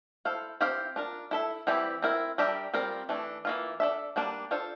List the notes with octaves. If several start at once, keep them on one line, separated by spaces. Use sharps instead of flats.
E4 A4 C5 F5
C4 E4 G4 C5 F5
D4 F4 A#4
E4 A4 E5
E3 G3 C4 E4 G4
C4 E4 A#4
G3 D4 G4 A#4 E5
G3 C4 F4 A#4
E3 A3 D4
E3 A#3 F4
D4 A4 E5
G3 A#3 D4
D4 F4 A4 C5